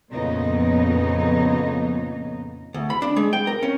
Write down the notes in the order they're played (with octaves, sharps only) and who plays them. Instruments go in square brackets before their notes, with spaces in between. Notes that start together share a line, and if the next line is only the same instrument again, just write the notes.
[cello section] F2 A#2 C#3 B3 D#4
[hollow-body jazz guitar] D2
B5
D4
G#3
G5
A#4
C#4